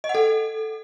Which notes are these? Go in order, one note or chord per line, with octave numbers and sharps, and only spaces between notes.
D#5
F#5
A4